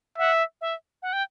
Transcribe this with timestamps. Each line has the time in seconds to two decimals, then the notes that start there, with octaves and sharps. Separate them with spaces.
0.18 E5 F#5
0.61 E5
1.02 F#5
1.13 G5